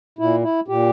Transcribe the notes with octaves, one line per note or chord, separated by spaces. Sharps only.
A#2 E4
E4
A#2 G4